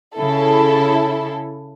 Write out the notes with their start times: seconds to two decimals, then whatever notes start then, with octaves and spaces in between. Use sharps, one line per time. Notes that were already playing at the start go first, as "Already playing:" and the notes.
0.16 C#3 E4 A4